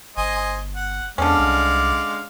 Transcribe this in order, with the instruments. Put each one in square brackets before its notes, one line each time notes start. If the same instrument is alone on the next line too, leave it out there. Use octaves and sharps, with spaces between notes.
[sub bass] G1 [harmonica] C5 D#5 G#5
[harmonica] F#5
[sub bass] E2 [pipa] D3 C#4 [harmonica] G#3 D5 F5
[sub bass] C2